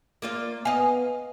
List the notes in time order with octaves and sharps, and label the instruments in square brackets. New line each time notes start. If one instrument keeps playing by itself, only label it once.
[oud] A#3 F4 D5
[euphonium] B3 [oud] D#5 F5 [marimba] G#5